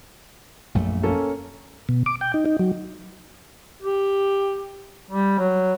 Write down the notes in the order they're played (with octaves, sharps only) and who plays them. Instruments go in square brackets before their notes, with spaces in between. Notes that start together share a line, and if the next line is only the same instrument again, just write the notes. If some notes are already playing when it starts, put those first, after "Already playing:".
[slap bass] A#1 F#2 A3
[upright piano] A#3 C#4 A4
[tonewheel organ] B2
D6
G5
D#4
D#4
F#3
[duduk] G4
G3
F#3